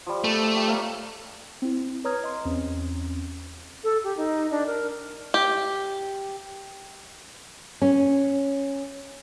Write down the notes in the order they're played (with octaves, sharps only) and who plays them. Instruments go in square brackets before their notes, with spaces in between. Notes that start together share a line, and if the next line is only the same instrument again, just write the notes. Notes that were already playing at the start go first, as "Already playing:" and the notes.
[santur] F3 G3
[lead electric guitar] A3
[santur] D5 D6
G4
A#4 C#5 F5
[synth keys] C4 E4
B4 C#5 A#5 D#6 F6 G#6
D#5 C6
E2 C4 C#4
[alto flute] A4
G4
D#4
D4
A#4
[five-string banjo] G4
[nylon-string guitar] C#4